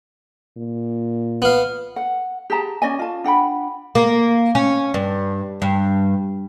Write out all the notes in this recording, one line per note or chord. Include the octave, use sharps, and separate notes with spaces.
A#2
B3 F5
F#5
G4 G#4 A5 A#5
C#4 D5 D#5 G#5
F4 A5
D4 F#5 G5 B5
A#3
C#4
G2
G2